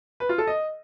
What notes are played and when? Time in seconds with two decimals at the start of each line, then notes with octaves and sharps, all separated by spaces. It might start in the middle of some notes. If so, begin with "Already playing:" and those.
0.20 B4
0.29 F4
0.38 A4
0.47 D#5